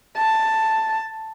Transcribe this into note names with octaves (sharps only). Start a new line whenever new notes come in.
A5